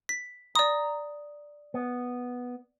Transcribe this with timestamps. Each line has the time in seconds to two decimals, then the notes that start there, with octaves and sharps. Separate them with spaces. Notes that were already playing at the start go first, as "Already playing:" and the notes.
0.09 B6
0.55 D5 A#5 D#6
1.74 B3